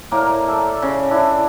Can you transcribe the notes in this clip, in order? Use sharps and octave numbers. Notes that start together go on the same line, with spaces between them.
A2 A#3 A#4 D5
A4 E5
C#3
D4 E4